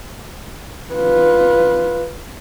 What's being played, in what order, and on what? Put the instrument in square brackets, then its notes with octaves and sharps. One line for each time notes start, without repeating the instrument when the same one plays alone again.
[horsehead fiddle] F4 B4